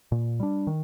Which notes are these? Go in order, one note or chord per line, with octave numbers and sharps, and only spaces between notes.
A#2
G3 D4
D#3